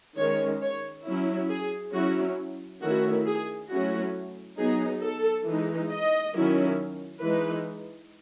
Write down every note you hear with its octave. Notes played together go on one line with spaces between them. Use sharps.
D#3 G#3 C#4 C#5
C#5
F#3 C#4 E4
G#4
F#3 C#4 E4 F#4
D#3 A3 C#4 E4 F#4
G#4
F#3 A3 C#4 E4 F#4
F#3 B3 D#4 G#4
A4
E3 G#3 D#4
D#5
D#3 F#3 C#4 E4
E3 G#3 D#4 B4